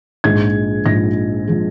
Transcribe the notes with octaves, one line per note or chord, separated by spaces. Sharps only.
A#1 G#2 F3 G#3 G#6
A#1 G#2 F3 G#3 A#6
F3 G#3